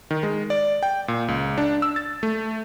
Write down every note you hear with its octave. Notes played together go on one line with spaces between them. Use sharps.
D#3
G#3
D5
G5
A#2
C#2
D4
E6
A6
A3